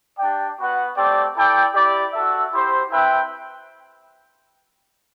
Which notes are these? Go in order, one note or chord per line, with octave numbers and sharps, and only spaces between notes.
D4 G4 D5 G5
B3 F#4 B4 F#5
A3 C4 G4 D5 G5
E4 A4 D5 G5
E4 G4 D5
F#4 A4 E5
E4 G4 C5
C4 E4 B4 E5 G5